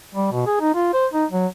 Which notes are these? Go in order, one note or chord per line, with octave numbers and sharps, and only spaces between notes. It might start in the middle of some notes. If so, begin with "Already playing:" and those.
G3
B2
G#4
D#4
F4
C5
D#4
F#3